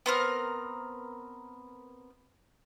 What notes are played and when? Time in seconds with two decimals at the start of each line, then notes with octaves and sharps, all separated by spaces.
0.06 B3 C4 A#4